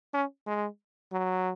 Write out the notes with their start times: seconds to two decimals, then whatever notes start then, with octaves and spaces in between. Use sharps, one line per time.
0.14 C#4
0.46 G#3
1.12 F#3